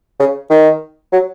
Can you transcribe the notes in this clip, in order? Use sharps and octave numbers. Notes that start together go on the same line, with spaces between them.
C#3
D#3
F#3